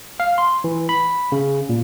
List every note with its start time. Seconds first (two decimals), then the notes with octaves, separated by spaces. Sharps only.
0.20 F5
0.38 C6
0.64 E3
0.89 B5
1.32 C#3
1.69 A#2